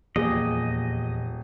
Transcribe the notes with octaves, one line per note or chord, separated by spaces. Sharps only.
D#1 E2 A#2 F3 G4 G#4 D#5